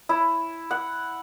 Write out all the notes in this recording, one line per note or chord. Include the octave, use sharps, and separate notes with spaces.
E4
F#5